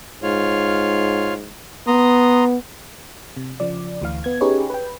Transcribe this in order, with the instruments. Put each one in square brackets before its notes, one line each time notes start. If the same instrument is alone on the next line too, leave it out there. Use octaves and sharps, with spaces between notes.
[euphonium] G#2 [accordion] F4 C#5 F5
[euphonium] B3 [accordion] A#5 C6 D#6
[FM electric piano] C3
C#3 F3 D5
D2 E3 F5
B3 G#6
C#4 D#4 G4 G#4 B4 C#5
B4 G5